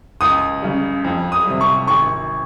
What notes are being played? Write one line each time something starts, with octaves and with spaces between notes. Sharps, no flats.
C#2 D#6
C#3 G3
F2
D#6
C3 G3
C#6
G#1 C#6